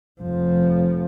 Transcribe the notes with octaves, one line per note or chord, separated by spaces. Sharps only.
F1 F3